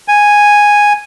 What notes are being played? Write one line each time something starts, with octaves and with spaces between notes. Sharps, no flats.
G#5